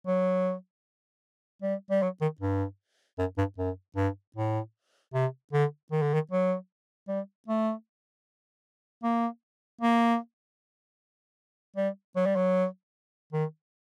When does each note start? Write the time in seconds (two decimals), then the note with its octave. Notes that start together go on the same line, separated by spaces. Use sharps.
0.07 F#3
1.63 G3
1.91 G3
2.03 F#3
2.21 D#3
2.41 G2
3.19 F#2
3.38 G2
3.58 F#2
3.96 G2
4.36 A2
5.14 C3
5.53 D3
5.92 D#3
6.02 D3
6.14 D#3
6.32 F#3
7.08 G3
7.48 A3
9.04 A#3
9.81 A#3
11.76 G3
12.16 F#3
12.26 G3
12.36 F#3
13.33 D#3